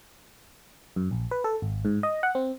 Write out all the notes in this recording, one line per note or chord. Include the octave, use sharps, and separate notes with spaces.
F#2
A#1
B4
A4
G#1
G#2
D#5
F#5
C4